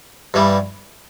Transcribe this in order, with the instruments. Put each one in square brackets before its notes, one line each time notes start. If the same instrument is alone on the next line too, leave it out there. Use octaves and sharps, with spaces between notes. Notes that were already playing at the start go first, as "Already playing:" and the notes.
[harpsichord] G2 E3 G3